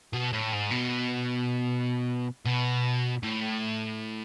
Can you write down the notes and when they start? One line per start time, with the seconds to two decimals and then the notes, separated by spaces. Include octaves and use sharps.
0.13 B2
0.33 A2
0.53 G#2
0.71 B2
2.46 B2
3.23 A2